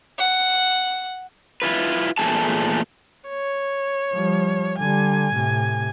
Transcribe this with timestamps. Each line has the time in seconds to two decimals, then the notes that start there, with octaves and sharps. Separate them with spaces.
0.18 F#5
1.62 E4 F4 B4
2.18 E2 A#2 A3 A#3 G#4 A5
3.29 C#5
4.13 F3 G3
4.79 D3 G3 G#5
5.33 A2 C3